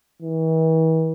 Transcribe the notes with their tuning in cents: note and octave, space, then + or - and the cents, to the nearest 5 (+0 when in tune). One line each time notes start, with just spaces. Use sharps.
E3 -40